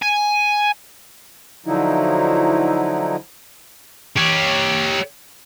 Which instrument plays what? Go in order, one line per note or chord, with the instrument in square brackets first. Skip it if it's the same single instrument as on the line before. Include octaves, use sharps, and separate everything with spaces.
[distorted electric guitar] G#5
[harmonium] D3 F3 F#3 D#4 E4
[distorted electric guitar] G4 C#5